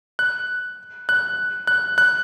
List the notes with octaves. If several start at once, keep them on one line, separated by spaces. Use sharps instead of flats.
F#6
F#6
F#6
F#6